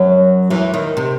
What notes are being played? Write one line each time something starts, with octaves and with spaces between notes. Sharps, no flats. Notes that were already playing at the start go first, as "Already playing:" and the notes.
Already playing: F#2 F#3
E2 E3
D#2 D#3
C3